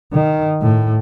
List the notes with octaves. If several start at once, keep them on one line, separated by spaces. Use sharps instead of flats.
D#3
A2